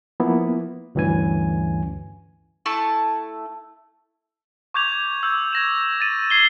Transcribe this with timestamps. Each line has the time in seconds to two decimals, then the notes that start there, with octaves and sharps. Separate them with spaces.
0.20 F3 A#3 B3 E4
0.95 D2 G2 E3 C#4 G#5
2.66 A3 E4 A5 C#6
4.74 C#6 D6 G6 G#6 F7
4.92 G#6
5.23 E6 G6
5.53 G#6 A#6 E7
6.00 A6 D#7
6.30 G#6 C7 G7